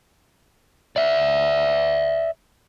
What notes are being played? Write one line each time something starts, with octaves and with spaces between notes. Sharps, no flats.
D5 E5